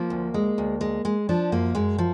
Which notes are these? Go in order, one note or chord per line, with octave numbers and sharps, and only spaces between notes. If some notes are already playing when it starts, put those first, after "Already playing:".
Already playing: F3 A#3
D2
G#3
D2
G#3
G#3
F3 D4
F#2 A#3
F#2 G#3
F3